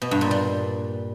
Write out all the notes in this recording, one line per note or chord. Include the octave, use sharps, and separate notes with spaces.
B2
G2
A#2
G3